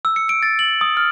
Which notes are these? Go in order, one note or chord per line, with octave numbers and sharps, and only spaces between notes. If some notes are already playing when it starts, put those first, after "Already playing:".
E6
C#7
D7
A6
F#7
D#6
F6